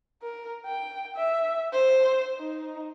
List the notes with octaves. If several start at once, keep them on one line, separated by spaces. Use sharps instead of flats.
A#4
G5
E5
C5
D#4